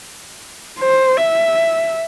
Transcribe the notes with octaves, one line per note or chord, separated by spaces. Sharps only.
C5
E5